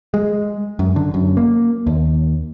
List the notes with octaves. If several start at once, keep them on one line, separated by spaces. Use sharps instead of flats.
G#3
F#2
D3
F#2
A#3
D#2